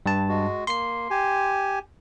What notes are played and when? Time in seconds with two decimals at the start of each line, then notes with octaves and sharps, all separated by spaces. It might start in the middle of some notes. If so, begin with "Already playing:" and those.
0.06 G2 A5
0.29 G#3 F#4
0.67 A#3 C6 C7
1.10 G4 G#5